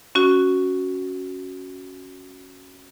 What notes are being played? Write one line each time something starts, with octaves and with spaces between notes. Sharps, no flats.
C#4 F#4